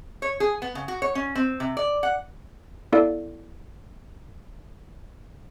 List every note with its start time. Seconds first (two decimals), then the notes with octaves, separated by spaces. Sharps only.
0.22 C#5
0.40 G#4
0.62 B3
0.75 C#3
0.88 F#4
1.02 C#5
1.15 C#4
1.35 C4
1.60 C3
1.77 D5
2.03 F#5
2.92 B3 E4 A4 D5 F5